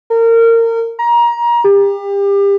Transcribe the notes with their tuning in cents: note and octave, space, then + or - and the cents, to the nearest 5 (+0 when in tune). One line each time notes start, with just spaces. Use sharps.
A#4 -25
A#5 +25
G4 +30